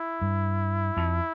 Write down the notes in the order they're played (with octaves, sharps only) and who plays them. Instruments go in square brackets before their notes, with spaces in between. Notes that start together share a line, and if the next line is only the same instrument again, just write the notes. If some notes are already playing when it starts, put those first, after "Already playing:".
Already playing: [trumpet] E4
[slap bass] G2
F2